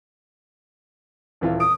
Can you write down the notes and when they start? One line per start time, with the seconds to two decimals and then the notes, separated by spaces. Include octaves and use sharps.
1.41 D#1 E3 F4
1.60 D#6 D7